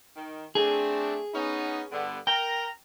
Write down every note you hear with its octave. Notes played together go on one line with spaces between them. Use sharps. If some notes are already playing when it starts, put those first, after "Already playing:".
D#3
A3 C4 D4 G#4
B3 C#4 D#4
G2 D3 B3
A#4 G5 A#5